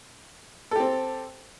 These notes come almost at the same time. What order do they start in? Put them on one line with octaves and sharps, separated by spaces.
A4 G4 C4